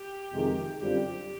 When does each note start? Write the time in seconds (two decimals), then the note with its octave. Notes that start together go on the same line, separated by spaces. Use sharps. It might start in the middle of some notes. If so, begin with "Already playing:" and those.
Already playing: G4
0.31 F2 C3 D#3 G#3
0.79 F#2 D3 G3 C4 F4 G4